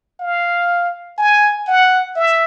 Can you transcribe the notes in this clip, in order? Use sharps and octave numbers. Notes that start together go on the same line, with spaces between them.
F5
G#5
F#5
E5